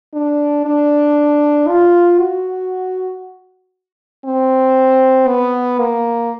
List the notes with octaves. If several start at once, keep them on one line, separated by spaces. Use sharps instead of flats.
D4
D4
F4
F#4
C4
B3
A#3